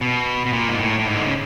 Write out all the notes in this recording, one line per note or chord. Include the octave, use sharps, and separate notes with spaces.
B2
B2
A#2
G#2
A2
A2
G#2
D3
C#3